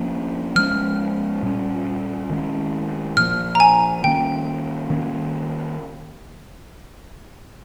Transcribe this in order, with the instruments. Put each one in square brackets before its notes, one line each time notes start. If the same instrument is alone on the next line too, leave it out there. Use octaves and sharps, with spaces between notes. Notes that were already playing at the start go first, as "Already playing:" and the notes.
Already playing: [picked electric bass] F3 A#3 C#4
[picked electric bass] F3 G#3 C#4 [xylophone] F6
[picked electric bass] A#2 G3 C#4
D#3 G#3 C#4
[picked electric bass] A#2 F3 A#3 [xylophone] F6
[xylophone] A#5
G#5
[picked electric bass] D#3 A#3 C#4 [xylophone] G5
[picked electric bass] D#3 A#3 C#4